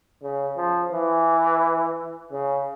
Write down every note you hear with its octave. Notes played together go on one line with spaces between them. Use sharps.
C#3
F3
E3
C#3